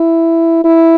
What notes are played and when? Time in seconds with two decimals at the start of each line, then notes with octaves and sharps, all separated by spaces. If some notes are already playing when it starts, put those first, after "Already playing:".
Already playing: E4
0.64 E4